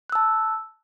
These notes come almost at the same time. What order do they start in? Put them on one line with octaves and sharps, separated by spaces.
F#6 E6 A5